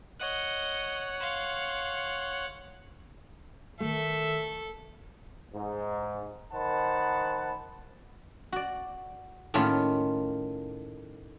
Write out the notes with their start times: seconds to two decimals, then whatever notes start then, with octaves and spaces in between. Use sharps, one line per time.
0.20 C#5 D#5 F#5 F#6
1.20 F5 C6
3.80 D#3 A3 A4 E5
5.54 G#2
6.53 D#3 C5 F#5 A5 B5
8.52 F#4 D5
9.54 A2 D#3 A3 A#3 C#4 F4